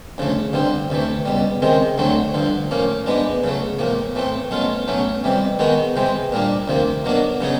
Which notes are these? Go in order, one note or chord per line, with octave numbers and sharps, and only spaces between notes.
D2 C#3 F3 A3
G2 D3 G3 C4
D2 C3 E3 A3
C#2 B2 G3
C#2 C3 D#3 G#3 C4
D2 D3 F#3 A3 C4
G2 D3 F3
A2 F3 A#3 C#4
G#2 E3 G#3 B3 D4
C#2 C#3 F#3 A3
B1 A2 F3 A#3
A2 E3 A3 C4
B2 F#3 A3 C#4 F4
B1 A2 F#3 A3 C#4
F2 C3 E3 G3
D#3 G#3 B3 D#4 F#4
C3 E3 G#3 C4
A#2 G3 A#3 D4
D2 C3 F3 A#3
B2 F#3 A#3 D4 F#4
C#3 F#3 B3 D#4 G#4